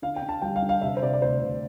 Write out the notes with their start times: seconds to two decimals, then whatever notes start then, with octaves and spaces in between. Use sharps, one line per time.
0.02 D3 F5
0.16 G5
0.22 D3
0.29 A5
0.42 G3 G5
0.56 F5
0.62 D3
0.69 F5
0.82 C3 E5
0.97 C5
1.02 C3 D5
1.13 D5
1.22 D2 C5
1.42 C3